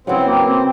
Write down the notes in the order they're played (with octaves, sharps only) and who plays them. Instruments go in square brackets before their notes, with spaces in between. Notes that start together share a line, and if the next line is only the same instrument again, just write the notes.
[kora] C#3 F#3 B3 E4 [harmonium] C4
[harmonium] A#3
C4